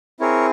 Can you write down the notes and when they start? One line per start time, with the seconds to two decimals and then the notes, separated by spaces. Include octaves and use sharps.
0.20 C4 E4 G#4 A#4 C#5